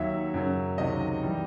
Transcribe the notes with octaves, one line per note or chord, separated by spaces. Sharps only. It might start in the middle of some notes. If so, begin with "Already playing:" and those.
Already playing: D#2 D#3 F#3 E5
F#2 C#3 F#3
C#2 C3 D#3 F#3 D#5
E3 G3